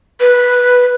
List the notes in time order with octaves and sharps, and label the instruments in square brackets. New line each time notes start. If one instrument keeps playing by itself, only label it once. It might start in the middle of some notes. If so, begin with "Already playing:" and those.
[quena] B4